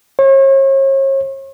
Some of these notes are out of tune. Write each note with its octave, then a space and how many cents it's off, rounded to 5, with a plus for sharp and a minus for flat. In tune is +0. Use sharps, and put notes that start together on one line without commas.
C#5 -40